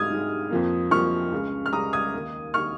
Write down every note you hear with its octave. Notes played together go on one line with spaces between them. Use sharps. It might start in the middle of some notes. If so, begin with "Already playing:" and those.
Already playing: G#2 G#3 D#6 F6 G#6
G#2 G#3
F2 F3 A#3
F2 F3 A#3 C#6 F6
C#2 C#3 G#3
F6
C#2 C#3 G#3 A#5 D#6
D#6 G#6
D#2 D#3 A#3
D#3 A#3 C#6 F6